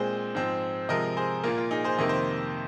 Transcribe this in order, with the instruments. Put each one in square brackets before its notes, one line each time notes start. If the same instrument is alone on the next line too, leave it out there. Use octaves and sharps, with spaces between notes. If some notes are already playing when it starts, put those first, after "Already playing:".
Already playing: [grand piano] A#2 G#3 C4 G#4 C5
G#2 F3 C4
C3 F3 G#3 A#4 D#5
G#4 C5
A#2 A#3 F4 A#4
F4
D#4 G#4
G#4 C5
F2 C3 D#3 A#3 D#5
C5